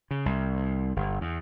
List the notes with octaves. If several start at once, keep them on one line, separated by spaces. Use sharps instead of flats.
C#3
C2
G1
E2